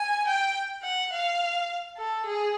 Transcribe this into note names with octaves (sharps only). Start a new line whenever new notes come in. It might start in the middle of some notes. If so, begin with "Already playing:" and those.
Already playing: G#5
G5
F#5
F5
A4
G#4